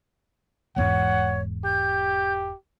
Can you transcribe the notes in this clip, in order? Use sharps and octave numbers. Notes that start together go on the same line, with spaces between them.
E1 E2 G#2 C#5 F#5
G4 G6